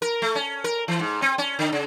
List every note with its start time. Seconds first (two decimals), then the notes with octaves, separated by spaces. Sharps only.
0.02 A#4
0.22 A3
0.35 C#4
0.64 A#4
0.88 E3
1.00 G#2
1.22 C4
1.38 C#4
1.59 D3
1.72 C#3